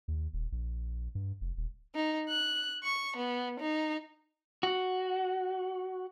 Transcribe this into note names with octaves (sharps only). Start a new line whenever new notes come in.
D#2
D#1
A#1
G2
F1
D#1
D#4
F#6
C#6
B3
D#4
F#4